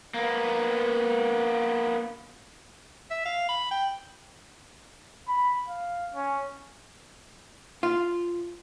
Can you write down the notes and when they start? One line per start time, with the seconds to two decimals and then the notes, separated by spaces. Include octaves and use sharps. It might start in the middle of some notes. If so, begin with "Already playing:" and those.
0.14 A#3 B3
3.11 E5
3.25 F5
3.49 B5
3.71 G5
5.28 B5
5.68 F5
6.14 C#4
7.83 F4